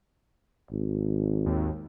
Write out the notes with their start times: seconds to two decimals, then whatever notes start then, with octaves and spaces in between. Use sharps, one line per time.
0.71 G#1
1.46 D#2